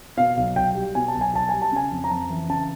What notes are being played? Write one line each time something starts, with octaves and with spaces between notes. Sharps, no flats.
B2 F5
B1
B1 G5
G3
B2 G#5
A5
B1
G#5
B1 A5
G3 G#5
A5
C#3 G#5
F2
A#5
F2 A5
E3
C#3 A5